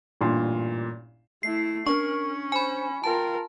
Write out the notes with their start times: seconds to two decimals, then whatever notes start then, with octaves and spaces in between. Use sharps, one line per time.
0.21 A1 G2 A#2 C6
1.43 A3 E4 C7
1.87 C#4 D4 A#4 C#6
2.52 C5 G#5 B5
3.04 F4 A#4 G5 A5